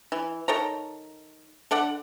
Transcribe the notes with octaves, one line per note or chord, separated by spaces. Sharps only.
E3
D#3 A4 C#5 A#5
D3 A4 D5 F#5